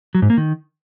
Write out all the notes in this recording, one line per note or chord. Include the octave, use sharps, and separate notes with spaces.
F#3
G#2
A#3
D#3